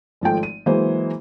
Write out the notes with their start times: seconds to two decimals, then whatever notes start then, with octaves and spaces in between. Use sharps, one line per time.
0.21 G#1 F3 A3 G5
0.43 D#7
0.66 E3 F#3 G#3 A#3 C5